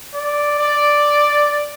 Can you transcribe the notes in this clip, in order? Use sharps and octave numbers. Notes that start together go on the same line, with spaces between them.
D5
D5